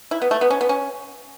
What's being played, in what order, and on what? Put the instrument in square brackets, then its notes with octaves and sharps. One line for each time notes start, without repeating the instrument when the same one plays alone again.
[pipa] E4
B3
A3
B3
C#4
B3
C#4